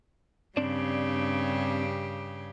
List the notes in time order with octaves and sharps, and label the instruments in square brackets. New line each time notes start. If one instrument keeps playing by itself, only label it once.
[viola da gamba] G2 C#3 G4 [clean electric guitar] C4 D4 D5